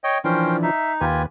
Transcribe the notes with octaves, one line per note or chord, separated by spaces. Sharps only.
C#5 D#5 G5
E3 F3 C#4 D4 A#4 C5 G5
D#4 E5
D#2 F4 G4 B4 G#5